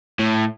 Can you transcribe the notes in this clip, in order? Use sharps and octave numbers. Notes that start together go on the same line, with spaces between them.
A2